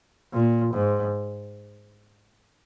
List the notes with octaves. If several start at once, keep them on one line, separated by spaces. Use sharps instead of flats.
A#2
G#2